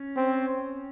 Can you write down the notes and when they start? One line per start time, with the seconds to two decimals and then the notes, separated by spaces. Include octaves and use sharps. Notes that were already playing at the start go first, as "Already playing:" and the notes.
Already playing: C#4
0.16 C4